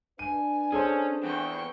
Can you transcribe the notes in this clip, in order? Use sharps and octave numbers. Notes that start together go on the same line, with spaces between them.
D4 B4 G#5 D#7
C#4 G#4 A4 C5
E2 G5 C#6